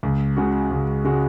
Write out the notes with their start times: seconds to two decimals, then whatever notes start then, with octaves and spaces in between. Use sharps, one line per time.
0.03 C#2
0.36 C#3 G#3 F#4
0.71 C#2
1.05 C#3 G#3 F#4